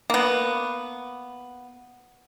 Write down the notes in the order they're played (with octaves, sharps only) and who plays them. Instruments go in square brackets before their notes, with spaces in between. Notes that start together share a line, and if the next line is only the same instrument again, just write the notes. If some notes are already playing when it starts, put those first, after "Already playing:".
[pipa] A#3 B3